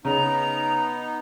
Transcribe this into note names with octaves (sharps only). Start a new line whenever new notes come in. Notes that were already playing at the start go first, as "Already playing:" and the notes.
C#3 B3 D#4 A#5